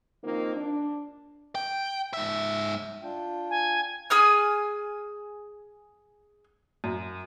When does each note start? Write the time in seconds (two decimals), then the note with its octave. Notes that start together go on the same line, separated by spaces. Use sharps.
0.23 D#3 F3 A#3 C4 D#4 F4
0.55 D4
1.55 G5
2.14 G#2 E5
3.03 D4 F4 G5
3.50 G#5
4.10 G#4 G#5 F6
6.84 F#2